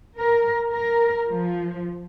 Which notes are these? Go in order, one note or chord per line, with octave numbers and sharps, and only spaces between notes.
A#4
A#4
F3